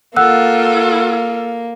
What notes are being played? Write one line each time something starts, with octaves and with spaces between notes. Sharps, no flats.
A#3 F4 A4 F#5 E6 F#6